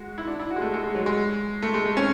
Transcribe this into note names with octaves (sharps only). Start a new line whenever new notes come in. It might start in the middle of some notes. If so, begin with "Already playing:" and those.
Already playing: G#3 F#4
E4
D4
E4
F#4
G#3
A3
G#3
G#3
F#3
G#3
A3
G#3
A3
C#4